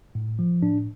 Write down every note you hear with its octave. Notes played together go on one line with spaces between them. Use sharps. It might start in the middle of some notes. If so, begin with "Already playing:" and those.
A2
F3
A2 D4